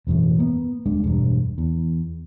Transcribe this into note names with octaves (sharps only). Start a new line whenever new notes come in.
E1 F#2 A2 E3
A#3 B3
D#1 G#3 D4
E1 G2
E2